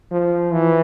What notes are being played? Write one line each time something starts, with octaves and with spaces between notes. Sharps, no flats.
F3
E3